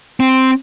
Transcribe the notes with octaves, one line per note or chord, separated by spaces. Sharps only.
C4